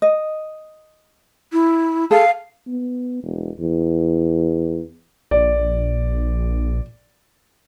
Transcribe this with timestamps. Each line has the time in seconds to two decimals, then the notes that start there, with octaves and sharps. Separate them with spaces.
0.02 D#5
1.53 E4
2.11 G#4 A4 F5 A5
2.68 B3
3.23 E1
3.60 E2
5.31 A#1 D5